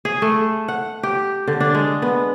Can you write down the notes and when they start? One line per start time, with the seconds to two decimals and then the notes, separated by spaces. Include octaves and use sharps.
0.05 G#4
0.22 A3
0.68 F#5
1.03 G4
1.47 D3
1.60 D4
1.74 G#3
2.02 B3